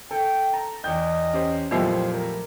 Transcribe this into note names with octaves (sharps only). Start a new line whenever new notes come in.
A4 G5
A5 A#5
E2 D#5 G5 G6
C#4 G4 C5
F2 A#2 F#3 A3 B3 E4 G4 C5
A#4